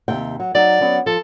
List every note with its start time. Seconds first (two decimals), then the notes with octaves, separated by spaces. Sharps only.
0.08 D#2 C3 G5
0.40 F#3
0.55 F#3 D#4 D5
0.81 F#3 B3 C#4
1.06 F3 A4